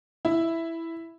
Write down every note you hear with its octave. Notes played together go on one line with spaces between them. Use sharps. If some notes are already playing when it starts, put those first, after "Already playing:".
E4